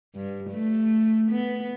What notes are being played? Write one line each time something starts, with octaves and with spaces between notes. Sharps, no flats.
G2
A3
B3